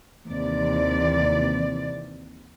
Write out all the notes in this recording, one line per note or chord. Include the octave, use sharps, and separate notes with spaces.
D#2 C3 E3 D5